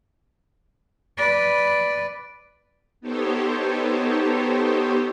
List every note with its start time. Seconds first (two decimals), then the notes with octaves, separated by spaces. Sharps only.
1.17 B4 D5
3.01 B3 D#4 G4 A4 C5 C#5